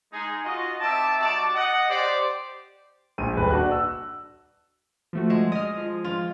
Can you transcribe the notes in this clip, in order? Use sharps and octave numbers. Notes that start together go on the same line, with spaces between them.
G#3 D#4 G#4
F4 F#4 D#5
C4 D#4 E5 A5 D6
G3 D#4 F#4 D5 A5 D6
D#5 F#5
G4 C5 D5
A#1 D#7
D#1 B4
D4 F#4 F#6
E6
F3 A3 F#4
G#3
D#5 D#6 F6
F3
F4